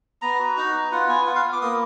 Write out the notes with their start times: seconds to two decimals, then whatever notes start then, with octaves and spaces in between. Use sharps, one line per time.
0.22 B3 A#5
0.39 F#4
0.57 D#4 A#5
0.74 B3
0.92 F4 F#5
1.09 B3 G#5
1.26 F4 F#5
1.35 F5
1.44 B3
1.53 D6
1.61 A#3 D#6